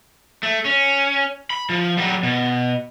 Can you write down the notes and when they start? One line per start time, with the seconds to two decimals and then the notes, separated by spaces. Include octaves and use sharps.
0.43 A3
0.65 C#4
1.50 B5
1.70 F3
1.97 F#3 G3
2.23 B2